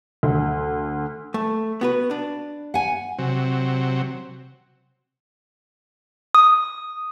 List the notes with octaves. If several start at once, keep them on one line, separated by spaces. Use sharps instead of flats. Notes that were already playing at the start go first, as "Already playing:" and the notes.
D2
A3
B3 F#4 B4
D4
F#5 G#5
C3 F#3
D#6